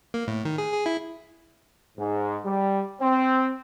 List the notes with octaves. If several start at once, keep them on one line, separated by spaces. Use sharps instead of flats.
A#3
A2
D#3
G#4
G#4
E4
G#2
G3
C4